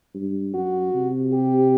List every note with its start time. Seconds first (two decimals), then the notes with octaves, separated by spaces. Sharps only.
0.14 G2
0.54 F#2 F#4
0.94 C3
1.33 G4